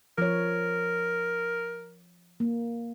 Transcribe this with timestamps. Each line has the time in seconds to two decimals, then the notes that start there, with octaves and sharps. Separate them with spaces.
0.18 F3 A#4 C#5
2.40 A#3